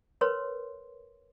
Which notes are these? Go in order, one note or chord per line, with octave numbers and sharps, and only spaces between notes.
A#4 B4 C#5 C6